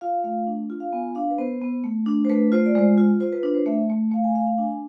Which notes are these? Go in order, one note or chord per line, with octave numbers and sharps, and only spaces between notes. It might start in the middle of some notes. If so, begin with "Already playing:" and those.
F4 F5
A3 F5
D4
F4
F5
B3 G#5
D4 F5
B4
B3 C5
B3
A3
D4
C5
A3 B4
F4 C5
D5
G#3 C5
F4
F4 C5
B4
D4 B4
C5
A3 E5
A3
A3 F5
G#5
A3 F5
F5
D4 G#5